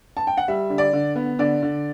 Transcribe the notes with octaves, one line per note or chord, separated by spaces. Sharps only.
A5
G5
F#5
G3 E5
D3
D5
D3
B3
D3 D5
D3